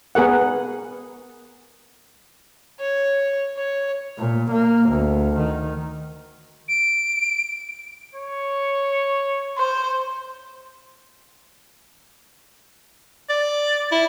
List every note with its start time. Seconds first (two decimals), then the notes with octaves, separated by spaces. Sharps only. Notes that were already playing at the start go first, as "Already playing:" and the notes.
0.15 B3 G#4 A#4 F#5
2.80 C#5
3.56 C#5
4.18 A#2
4.51 A#3
4.90 D2
5.37 D#3
6.68 D7
8.15 C#5
9.58 C5
13.29 D5
13.92 E4